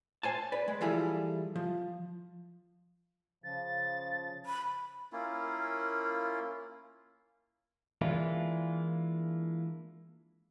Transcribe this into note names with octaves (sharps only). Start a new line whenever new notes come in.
C5 G#5 A5
B4 D5
G#3
E3 F3 G3 E4 G#4 A4
F3
C#3 F3 A6
B5
A#3 C#4 E4 F4
E3 G#3 A#3 D4 E4 F4